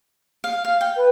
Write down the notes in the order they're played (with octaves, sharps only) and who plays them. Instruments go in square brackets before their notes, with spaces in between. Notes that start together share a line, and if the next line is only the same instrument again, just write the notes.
[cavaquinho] F5
F5
G5
[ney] B4